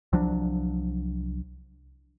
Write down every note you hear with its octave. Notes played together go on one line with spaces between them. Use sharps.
C2 F3 F#3 D4